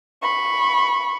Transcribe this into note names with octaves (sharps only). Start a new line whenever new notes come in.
B5 C#6